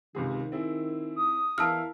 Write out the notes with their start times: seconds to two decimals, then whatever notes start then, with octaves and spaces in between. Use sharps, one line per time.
0.15 C#2 C3 D#3 G#4
0.52 C4 E4 G#4
1.16 D#6
1.58 E2 E4 A#4 F5 A5 E6 F6